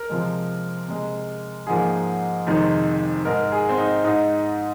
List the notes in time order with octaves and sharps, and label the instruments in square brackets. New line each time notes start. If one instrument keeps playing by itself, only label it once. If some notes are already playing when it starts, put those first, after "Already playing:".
Already playing: [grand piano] A#4
C3 F3 G#3
C3 G#3
G#2 F3 A#3 G#4
F2 C3 D#3 G#3
G#2 G#3 A#4
G#4
C4
D#4
G#2 G#3 D#4